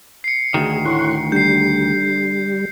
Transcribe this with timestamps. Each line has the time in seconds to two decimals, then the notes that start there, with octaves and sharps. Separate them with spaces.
0.24 C7 C#7
0.54 D2 D#3 F#4 G#4
0.85 A2 F#5 C6 C#6
1.32 D3 G3 G6 C7